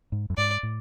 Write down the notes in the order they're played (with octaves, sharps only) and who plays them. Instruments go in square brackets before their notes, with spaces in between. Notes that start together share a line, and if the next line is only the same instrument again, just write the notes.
[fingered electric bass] G#2
F#2
[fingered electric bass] G#2 [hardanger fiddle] D5
[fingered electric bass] A2